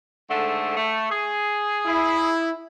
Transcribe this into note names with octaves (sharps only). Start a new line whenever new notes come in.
G#2 D3 A3
A3
G#4
E4